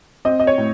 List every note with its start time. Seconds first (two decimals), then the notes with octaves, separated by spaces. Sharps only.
0.25 C4 D#5
0.40 D#5
0.47 C#5
0.58 A2